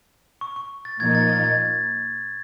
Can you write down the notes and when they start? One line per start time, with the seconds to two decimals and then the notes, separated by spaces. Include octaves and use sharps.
0.41 C#6
0.56 C#6
0.85 A6
1.00 A#2 F3 A#3 D#4 G#6
1.15 A6
1.29 A6
1.44 G#6
1.59 A6